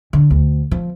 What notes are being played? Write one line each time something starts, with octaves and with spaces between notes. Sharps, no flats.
D3
D2
F3